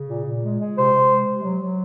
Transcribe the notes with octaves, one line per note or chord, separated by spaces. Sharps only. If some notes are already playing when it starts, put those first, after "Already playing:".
Already playing: C#3
A#2
A#2
G#3
G#3
C3 C5
C3
G#3
C3
F#3
F#3